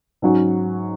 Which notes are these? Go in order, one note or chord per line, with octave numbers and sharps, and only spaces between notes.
G#2 F#3 C#4 F#4